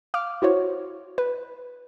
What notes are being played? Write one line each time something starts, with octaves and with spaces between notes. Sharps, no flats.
F5 D6 F6
E4 F#4 C5 C#5
B4